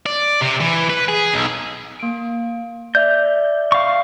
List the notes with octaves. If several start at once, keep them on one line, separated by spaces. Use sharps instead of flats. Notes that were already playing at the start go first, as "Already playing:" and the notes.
D5
C3
E3
B4
G#4
B1
A#3 D7
D5 E5 G6
F5 C#6